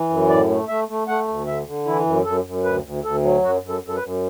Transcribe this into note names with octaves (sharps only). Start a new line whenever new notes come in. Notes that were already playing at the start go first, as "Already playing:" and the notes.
Already playing: E3
F#2
A2 D5
A3
A3 E5
A3
A3 F#5
D2
D3 E5
D3
E3 E4
F#2
F#2 A4
F#2
D2 B4
D2
D2 A4
F#3
F#2 F#4
F#2
A4
F#2
A4
B4
F#2